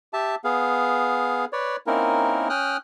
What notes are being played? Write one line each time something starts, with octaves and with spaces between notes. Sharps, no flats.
G4 E5 A5
B3 G#4 F5
B4 C#5 D5
A#3 C4 C#4 D#4 E4 A#4
C#4 G5 D#6 F6 F#6